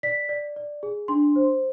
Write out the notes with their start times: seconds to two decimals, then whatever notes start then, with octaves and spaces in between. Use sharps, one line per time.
0.03 D5 B6
0.29 D5
0.56 D5
0.83 G#4
1.08 D4 C6
1.36 C5